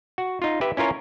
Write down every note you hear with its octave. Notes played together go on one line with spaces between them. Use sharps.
F#4
D#4 F4
G4 B4 E5
C#4 E4 F4 A#4 C#5